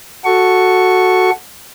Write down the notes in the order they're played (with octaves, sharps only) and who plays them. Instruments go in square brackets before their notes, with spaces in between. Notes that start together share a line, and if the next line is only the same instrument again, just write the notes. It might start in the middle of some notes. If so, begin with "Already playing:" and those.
[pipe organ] F#4 A4 C#6